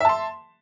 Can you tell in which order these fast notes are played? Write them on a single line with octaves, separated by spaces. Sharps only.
E5 A5 C6